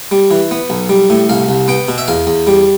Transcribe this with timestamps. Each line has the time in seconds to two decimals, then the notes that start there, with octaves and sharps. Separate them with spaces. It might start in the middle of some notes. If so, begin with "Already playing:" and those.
0.11 G3
0.31 E3
0.51 B3
0.70 B1
0.89 G3
1.10 A2
1.29 C2 F5
1.49 C2
1.68 B3 G5
1.88 B2
1.98 E5
2.08 E2 F5
2.27 E2
2.47 G3